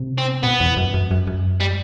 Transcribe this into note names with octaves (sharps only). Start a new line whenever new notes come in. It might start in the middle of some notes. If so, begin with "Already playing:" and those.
Already playing: C3
C4
B2 B3
E2
F#2
F#2
F#2
F#2
G3